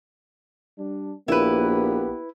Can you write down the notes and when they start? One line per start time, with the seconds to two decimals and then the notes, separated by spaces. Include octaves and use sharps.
0.78 G3 D4
1.28 A#1 A#3 B3 E4 G4 B4